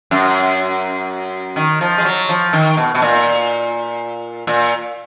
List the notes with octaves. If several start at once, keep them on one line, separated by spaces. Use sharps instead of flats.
F#2
D#3
F3
G#3
F#3
F3
D#3
B2
B2
A#2
A#2